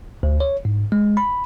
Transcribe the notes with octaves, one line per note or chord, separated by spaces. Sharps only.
D2
C#5
G#2
G#3
B5